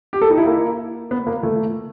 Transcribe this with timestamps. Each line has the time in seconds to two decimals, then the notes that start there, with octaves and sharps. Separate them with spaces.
0.13 G4
0.22 A4
0.30 D#4
0.38 E4
0.46 A#3
1.11 B3
1.27 A#3
1.43 A3